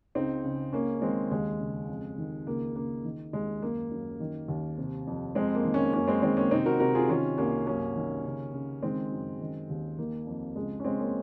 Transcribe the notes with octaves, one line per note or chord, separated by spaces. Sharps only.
C#2 C4 D#4
C#3
C#2 A#3 C#4
D#3 G#3 C4
D#2 G#3
C#3
F2
D#3
C#2 A#3
C#2 A#3
D#3
D#2 G#3
F#2 A#3
F#2
D#3
D#2
C3
F2
F2 G#3 C4
A#3
D#3
A#3 C#4
F#2 A#3 C#4
G#3 C4
D#3 G#3 C4
A#3 C#4
C3 C4 D#4
F#4 A#4
C3 F#4 A#4
F4 G#4
D#3 C#4 F4
C2 A#3 C#4
F#2 A#3 C#4
D#3
C#3
C#3
D#3 G#3 C4
F#2
D#3
D#2
D#3 A#3
F2
C#2 G#3
C#4
C#2 G#3 C4
A#3 C#4